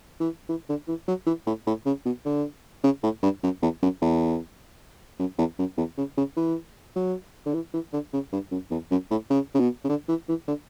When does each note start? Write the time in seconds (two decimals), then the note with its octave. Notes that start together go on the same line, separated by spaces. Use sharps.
0.20 E3
0.49 E3
0.69 D3
0.88 E3
1.08 F#3
1.27 E3
1.46 A2
1.66 A2
1.86 C#3
2.05 B2
2.25 D3
2.84 C#3
3.03 A2
3.23 G2
3.43 F#2
3.62 E2
3.82 F#2
4.01 E2
5.19 F#2
5.38 E2
5.59 F#2
5.77 E2
5.97 C#3
6.17 C#3
6.37 E3
6.96 F#3
7.46 D3
7.54 E3
7.73 E3
7.93 D3
8.13 C#3
8.32 G2
8.51 F#2
8.71 E2
8.91 F#2
9.10 A2
9.30 C#3
9.54 C#3
9.60 B2
9.84 C#3
9.89 D3
10.08 E3
10.28 E3
10.48 D3